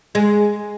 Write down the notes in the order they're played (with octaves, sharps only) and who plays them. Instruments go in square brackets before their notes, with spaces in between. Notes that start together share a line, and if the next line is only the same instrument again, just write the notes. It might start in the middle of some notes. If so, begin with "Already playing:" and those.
[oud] G#3